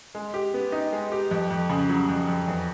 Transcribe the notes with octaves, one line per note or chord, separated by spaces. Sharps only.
G#3
G4
B3
D#4
G#3
G4
F2
F2
C#3
F#3
F2
F2
E2